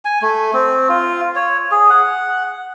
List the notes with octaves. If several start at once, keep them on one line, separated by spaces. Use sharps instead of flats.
G#5
A3
C4
F4
C#5
G#4
F#5